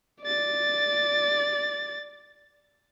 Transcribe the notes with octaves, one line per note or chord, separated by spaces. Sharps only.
D5 A6